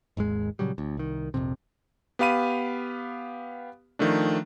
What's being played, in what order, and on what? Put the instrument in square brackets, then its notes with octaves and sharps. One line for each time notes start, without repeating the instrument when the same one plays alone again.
[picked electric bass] G#1 D#2 G#2 G#3
A#2 C#3 F#3 G3
D2
C2 D#3
A#1 F2 C3
[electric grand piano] B3 G4 F5 B5 D#7
D#3 F3 A3 D4